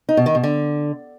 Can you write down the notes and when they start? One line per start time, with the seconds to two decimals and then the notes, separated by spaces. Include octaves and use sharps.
0.09 D#4
0.17 B2
0.26 D#3
0.35 B2
0.43 D3